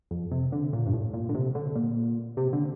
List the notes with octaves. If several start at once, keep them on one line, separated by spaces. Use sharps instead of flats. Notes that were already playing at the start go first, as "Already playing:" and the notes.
F2
C3
D3
A#2
G2
A2
A#2
D3
C3
D3
A#2
C3
D3